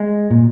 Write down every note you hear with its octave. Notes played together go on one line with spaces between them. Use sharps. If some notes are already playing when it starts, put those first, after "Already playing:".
Already playing: G#3
A#2